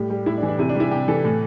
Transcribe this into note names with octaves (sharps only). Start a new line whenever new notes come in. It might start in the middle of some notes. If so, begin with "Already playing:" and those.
Already playing: A2 G3 G4
G3
A2 E4
D4
E3
D4
C3 E4
D4
G3 E4
C3 G4
E3 A4
A2 A4